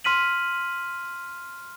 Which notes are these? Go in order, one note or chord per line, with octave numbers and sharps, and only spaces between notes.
C6 F6 B6 D#7 F#7